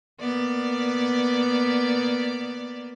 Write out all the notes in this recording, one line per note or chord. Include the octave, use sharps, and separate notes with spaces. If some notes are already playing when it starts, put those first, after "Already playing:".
A#3 B3 D5